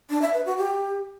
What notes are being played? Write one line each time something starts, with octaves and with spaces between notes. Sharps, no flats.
D4
E5
B4
F#4
G4